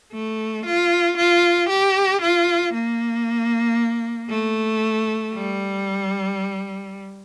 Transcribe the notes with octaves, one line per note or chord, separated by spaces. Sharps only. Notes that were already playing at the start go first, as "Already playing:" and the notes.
A3
F4
F4
G4
F4
A#3
A3
G3